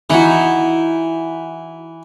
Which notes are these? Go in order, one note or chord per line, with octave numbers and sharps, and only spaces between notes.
E3 D#4 E4 F#4